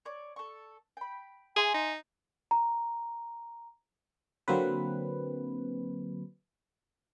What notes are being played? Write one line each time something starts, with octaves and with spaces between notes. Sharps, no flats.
C#5 D5
A4 C#6
G5 B5
G#4 E5 G#5 C6
D#4
A#5
D3 F#3 A#3 C4 B4